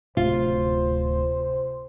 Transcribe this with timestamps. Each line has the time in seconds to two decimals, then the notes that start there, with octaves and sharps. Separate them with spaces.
0.17 D1 C3 F4 C5